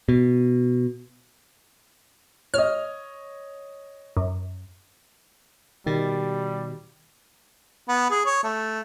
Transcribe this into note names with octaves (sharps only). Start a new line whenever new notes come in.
B2
C#5 D#5 F6
F#2
B2 D#3 G3 G4 A6
B3
G#4
C#5
A3